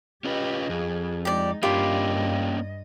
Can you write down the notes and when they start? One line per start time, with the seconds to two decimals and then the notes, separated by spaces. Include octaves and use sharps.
0.25 C#4 F4 G4 B4 D#5
0.69 F2 G#4
1.25 G#3 D#4 G4 D5
1.63 G2 A#3 C#4 D4 F4 G4 D#5 B5